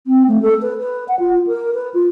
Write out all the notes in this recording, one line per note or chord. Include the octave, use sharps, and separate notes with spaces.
C4
A3
A4
B4
B4
F#5
F4
A#4
B4
F4